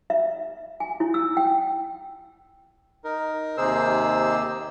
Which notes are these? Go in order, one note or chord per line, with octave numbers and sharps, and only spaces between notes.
E5
G#5
E4
E6
G5
D#4 A#4
D#2 C3 D#4 G#4 C5 E6